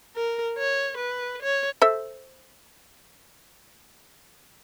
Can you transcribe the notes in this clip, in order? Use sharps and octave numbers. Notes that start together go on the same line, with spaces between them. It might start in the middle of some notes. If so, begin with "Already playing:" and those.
A#4
C#5
B4
C#5
A4 C5 E5